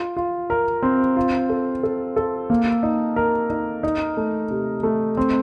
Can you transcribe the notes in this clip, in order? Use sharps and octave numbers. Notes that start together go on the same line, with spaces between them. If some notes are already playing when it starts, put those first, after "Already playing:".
Already playing: F4
F4
A#4
C4
F4
A4
A4
A4
A#3
D#4
A#4
D#4
D#4
A3
C3
A3
C4